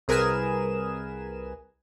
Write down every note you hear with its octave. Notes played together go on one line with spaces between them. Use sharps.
C2 G#4 A#4 B4 G#5 E7